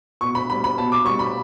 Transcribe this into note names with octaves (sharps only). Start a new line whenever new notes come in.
B2 C#6
B5
G3 B5
B5
B2 A5
D6
G3 C#6
B5